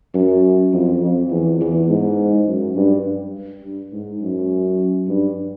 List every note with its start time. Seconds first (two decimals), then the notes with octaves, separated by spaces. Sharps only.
0.14 F#2
0.74 F2
1.02 F2
1.30 E2
1.61 E2
1.89 G#2
2.48 F#2
2.76 G2
3.63 G2
3.93 G#2
4.22 F#2
5.09 G2